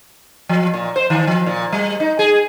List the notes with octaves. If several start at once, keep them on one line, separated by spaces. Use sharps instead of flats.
F3
A#2
C5
D#3
F3
A#2
G3
D#4
G#4